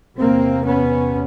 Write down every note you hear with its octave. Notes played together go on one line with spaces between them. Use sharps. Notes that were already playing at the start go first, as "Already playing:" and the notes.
E2 C3 A#3 C4
B3 C#4